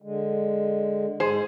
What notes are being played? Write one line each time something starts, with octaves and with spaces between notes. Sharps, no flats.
D3 G#3
G#2 G#4 C5